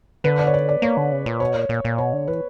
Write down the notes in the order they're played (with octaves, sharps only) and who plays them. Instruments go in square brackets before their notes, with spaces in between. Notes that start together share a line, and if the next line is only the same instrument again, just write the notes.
[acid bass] D3 [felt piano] B4
[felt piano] D5
C#5
D5
D5
[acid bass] A#3 [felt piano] C#5
[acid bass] D3
C#3
A#2
[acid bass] B2 [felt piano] C#5
[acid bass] A#2
A#2
A#2
[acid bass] B2 [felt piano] C#5
[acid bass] D3
[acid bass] E3 [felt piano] B4